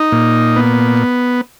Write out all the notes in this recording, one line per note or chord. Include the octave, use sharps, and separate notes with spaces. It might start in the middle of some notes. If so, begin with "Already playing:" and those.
Already playing: D#4
A#2
B3